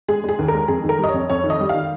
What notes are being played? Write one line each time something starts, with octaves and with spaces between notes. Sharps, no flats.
G#3 G#4
G#3 G#4
D#2
A#4
G#3
F2 G#4
D#3
A#4
G3 D#5
C#5
F2
F2 C#5
D#3
D#5
G3
D#3 F5